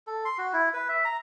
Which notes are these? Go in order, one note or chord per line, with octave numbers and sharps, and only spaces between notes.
A4
C6
F#4
E4
B4
E5
A#5